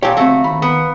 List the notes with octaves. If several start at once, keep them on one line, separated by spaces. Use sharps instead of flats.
A#2 F3 G4 C#5 G#5 A#5
D2 A3 C4 F#4
D#2 B5
B3